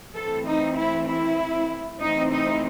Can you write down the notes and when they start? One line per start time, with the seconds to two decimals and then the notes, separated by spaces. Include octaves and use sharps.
0.14 E3 A3 C4 A4
0.46 D#4
0.77 E4
1.07 E4
2.00 C3 E3 A3 C4 D#4
2.32 D#4